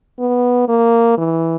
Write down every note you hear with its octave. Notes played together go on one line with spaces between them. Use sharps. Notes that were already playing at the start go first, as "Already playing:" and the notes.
B3
A#3
E3